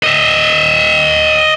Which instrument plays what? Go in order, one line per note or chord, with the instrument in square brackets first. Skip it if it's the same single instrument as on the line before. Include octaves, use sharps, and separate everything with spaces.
[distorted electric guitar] D#5 E5